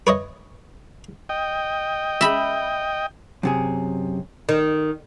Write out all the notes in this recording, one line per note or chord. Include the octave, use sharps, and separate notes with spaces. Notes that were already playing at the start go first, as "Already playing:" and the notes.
B4 C#5 D#5
D#5 G5
E5 B5
F#2 C3 G#4
D#3